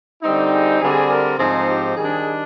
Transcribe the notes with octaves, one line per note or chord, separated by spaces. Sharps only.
D3 G3 C4 D#4
G#4
D3 G3 C4 G#4
A#4
G#2 F3 C4 D#4 G#4
G4
D#3 G3 D4 G#4